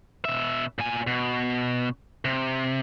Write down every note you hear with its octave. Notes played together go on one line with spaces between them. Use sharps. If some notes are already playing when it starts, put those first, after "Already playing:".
B2 E5
A#2 G#5
B2
C3